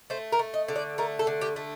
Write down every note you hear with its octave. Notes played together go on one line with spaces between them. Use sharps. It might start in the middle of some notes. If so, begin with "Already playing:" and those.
A3 C5
A#4
A3
D#5
D3
D5
A3 A#4
A4
D3
G4
A3